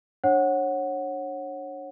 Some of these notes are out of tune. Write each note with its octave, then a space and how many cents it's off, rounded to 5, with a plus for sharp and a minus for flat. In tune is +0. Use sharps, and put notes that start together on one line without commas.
D4 +10 C#5 -25 F#5 +0